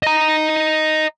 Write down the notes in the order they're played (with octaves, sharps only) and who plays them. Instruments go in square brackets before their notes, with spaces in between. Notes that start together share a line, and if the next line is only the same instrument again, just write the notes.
[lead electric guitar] D#5 A#5